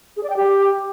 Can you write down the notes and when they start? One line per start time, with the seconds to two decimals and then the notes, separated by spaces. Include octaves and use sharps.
0.17 G#4
0.23 D5
0.30 G5
0.36 G4